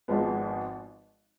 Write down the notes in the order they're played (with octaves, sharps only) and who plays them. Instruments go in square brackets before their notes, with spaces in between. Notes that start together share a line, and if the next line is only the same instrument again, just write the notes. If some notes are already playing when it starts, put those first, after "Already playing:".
[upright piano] G#1 G#2 F3 G#3 B3